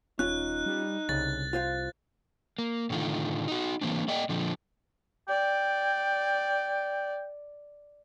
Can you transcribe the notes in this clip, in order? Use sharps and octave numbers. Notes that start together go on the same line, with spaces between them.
D#1 C#4 D#4 F4 F#6
G3
C2 C#3 A6
F4 C5 F5
A#3
A2 D3 D#3 F4
D#4 F#4
E3 A#3 C4 D4
A#3 D5 D#5 G5
A#2 D3 F3
D5 G5